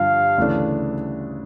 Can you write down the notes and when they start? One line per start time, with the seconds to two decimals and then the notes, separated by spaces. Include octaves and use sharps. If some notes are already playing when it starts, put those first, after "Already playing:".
Already playing: G2 D3 F3 F5
0.38 D2 C#3 E3 A3 D4